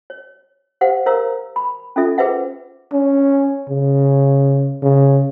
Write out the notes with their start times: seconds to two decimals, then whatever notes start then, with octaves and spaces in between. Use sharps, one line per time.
0.10 C#5
0.81 G4 C5 F5 F#5
1.06 A#4 C5 C#5 F5 A#5 E6
1.56 B5
1.96 C#4 D#4 F4 A4 E5
2.18 G#4 B4 C5 E5 F#5
2.93 C#4
3.69 C#3
4.83 C#3